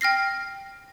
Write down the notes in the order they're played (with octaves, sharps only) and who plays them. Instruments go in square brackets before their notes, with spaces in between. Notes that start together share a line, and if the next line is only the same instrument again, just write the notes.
[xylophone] G5 F6 A#6 C7